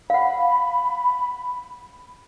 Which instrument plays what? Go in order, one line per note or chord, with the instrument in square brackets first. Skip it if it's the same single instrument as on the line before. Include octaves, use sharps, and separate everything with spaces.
[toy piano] F5 F#5 [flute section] B5